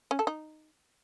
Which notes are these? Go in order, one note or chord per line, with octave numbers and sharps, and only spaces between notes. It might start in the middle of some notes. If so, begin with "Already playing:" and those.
C#4
A4
D#4